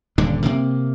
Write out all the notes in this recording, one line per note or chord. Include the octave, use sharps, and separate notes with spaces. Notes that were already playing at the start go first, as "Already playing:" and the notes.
D#1 G2 D3 D4
C3 A#3